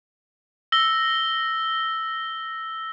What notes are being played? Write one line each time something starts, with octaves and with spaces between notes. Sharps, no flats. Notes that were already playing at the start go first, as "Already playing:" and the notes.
E6 A#6 G7